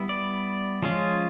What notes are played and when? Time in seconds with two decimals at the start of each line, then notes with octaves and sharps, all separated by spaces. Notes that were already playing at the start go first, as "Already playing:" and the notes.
Already playing: G3 B3 E4
0.09 D5
0.82 F3 G#3 C#4 F4